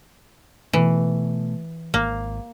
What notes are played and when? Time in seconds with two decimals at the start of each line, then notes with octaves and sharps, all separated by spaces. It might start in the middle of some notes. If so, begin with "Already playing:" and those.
0.73 B2 E3 A3
1.94 G#1 A#3